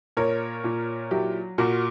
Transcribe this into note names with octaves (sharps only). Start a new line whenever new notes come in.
A#2 A#4 C#5
A#2
F#3 E4 G4
A#2 F#4 A#4